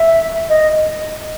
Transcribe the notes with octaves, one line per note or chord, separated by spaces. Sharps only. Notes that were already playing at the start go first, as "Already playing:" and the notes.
Already playing: E5
D#5